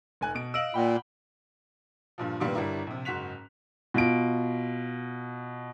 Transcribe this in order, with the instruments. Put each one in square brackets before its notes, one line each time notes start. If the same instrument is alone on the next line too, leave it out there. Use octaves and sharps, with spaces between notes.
[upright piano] F1 G#5 F#6
B2 D7
[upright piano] D#5 F5 [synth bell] E6 D7 F#7
[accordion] A#2 [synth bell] F#5 G5 B5
[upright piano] G2 A#2 F3
G2 A#2 D#3 G3 A#3 B3
G1 G3 D4 E4 A#4
A#1 C3
F#1 G#2 F#4 F#6 B6 F7
B2 F4 D7